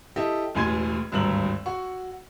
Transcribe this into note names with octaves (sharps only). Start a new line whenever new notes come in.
E4 G4 A4 D#5
E1 A1 A2 G#5 C6 G#6
G#1 D2 G2 A#5 E6 F#7
F#4 C#6